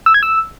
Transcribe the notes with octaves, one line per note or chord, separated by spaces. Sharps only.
E6
G#6
E6